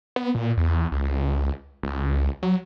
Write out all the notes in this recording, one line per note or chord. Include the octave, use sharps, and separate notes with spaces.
B3
A#2
E2
C#2
C#2
F#3